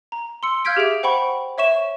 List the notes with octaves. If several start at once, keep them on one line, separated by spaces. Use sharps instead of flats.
A#5
C6 E6 C#7 G7
F5 F6 G6 G#6 B6 D7
G4 G#4 E5 D7
C5 F#5 G5 B5 C#6
C#5 E5 C#6 E7